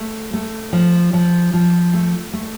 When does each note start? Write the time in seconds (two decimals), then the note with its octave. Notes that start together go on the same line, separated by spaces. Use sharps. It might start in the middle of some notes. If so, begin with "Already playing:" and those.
Already playing: A3
0.34 A3
0.73 F3
1.13 F3
1.53 F3
1.94 A3
2.33 A3